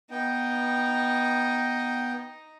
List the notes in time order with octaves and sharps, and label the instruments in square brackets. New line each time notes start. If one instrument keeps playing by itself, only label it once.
[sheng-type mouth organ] B3 G5 [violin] D#4